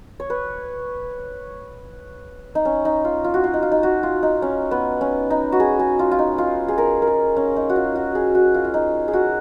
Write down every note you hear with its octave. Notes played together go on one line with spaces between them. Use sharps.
C#5
B4
D#4
C#4
D#4
F4
F4
F#4
F4
D#4
F4
D#4
F#4
F4
D#4
C#4
B3
C#4
D#4
F#4
G#4
G#4
F4
F4
D#4
F4
G#4
A#4
A#4
G#4
C#4
D#4
F#4
F4
F#4
G#4
F#4
F4
F4
D#4
G#4
F#4